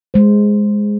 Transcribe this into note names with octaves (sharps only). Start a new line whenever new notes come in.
G#3 C5